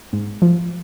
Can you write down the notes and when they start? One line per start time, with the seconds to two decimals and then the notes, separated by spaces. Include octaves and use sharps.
0.13 G#2
0.42 F3